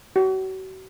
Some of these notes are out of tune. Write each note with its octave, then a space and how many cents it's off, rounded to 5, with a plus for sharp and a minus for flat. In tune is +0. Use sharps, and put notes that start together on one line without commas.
F#4 +40